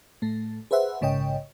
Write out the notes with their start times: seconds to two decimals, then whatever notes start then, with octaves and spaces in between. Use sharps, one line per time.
0.22 A2 A3
0.71 G#4 B4 C5 E5 F#5
1.01 A#1 G#2 C#3 C#5 D#5 G5